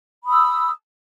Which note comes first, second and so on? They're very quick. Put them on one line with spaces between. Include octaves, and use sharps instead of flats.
B5 D#6 E6